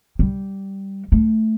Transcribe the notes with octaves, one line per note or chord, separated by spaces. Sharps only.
G3
A3